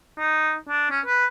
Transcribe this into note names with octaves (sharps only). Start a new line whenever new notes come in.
D#4
D4
C#4
B4